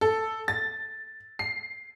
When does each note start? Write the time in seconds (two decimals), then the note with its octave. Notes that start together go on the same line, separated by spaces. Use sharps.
0.01 A4
0.48 A6
1.39 C7